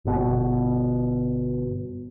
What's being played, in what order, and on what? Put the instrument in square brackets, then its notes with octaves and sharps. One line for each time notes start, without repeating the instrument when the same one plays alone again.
[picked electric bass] G1 B2